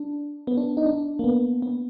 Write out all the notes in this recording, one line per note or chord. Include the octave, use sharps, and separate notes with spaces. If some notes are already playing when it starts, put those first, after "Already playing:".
Already playing: D4
B3
D4
D#4
D4
A#3
B3
B3